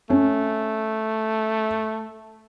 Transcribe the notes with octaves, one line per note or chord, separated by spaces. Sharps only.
A3 C#4